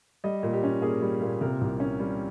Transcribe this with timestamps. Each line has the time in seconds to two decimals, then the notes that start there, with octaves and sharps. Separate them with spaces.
0.24 G3 D#5
0.43 A#2
0.53 G4
0.63 C#4
0.82 A#3 G#4
1.02 G3
1.21 A#2
1.41 C3 A#4
1.61 C2
1.80 C#4
2.00 G3